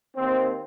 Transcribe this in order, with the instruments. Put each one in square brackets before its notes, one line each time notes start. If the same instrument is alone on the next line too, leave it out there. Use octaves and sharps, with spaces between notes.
[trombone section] D#2 D#3 C4